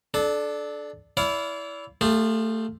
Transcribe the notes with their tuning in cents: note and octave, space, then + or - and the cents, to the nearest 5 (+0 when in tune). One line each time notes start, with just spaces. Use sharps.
D4 +5 A4 -25
E4 +0 D5 -40 F5 +0
A3 +20 F4 +10 G#4 -40